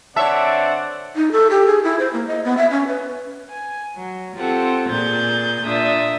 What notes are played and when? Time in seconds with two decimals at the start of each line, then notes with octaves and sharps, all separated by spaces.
0.16 D3 C4 C#5 D5 E5 F#5 A5
1.16 D#4
1.32 A4
1.50 G4
1.67 G#4
1.83 E4
1.99 C5
2.13 A#3
2.27 D#5
2.45 B3
2.57 E5
2.71 C#4
2.88 B4
3.49 G#5
3.95 F#3
4.36 C4 F4 G4 A4 F#5
4.90 A#2 G#4 G6 A6
5.63 A#2 D4 E5 D#6 A6